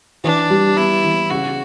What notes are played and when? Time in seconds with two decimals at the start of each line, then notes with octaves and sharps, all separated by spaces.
0.24 E3 D4
0.50 G3
0.77 B3 E4
1.04 E3
1.30 C#3 F#4